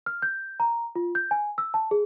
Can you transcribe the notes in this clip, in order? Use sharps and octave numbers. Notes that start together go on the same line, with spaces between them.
F6
G6
A#5
F4
G6
G#5
E6
A5
G#4